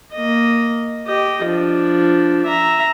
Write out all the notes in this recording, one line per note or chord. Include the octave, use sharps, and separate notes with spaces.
A#3 D#5
G4 D#5
F3 D4
E5 A#5